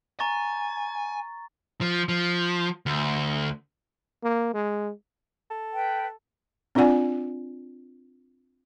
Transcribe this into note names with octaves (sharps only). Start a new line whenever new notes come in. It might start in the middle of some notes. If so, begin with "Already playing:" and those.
G#5 A#5 C#6 A6
F3
F3
D2
A#3
G#3
A4
B4 G5
C4 D4 F4 D5 F#5 G#5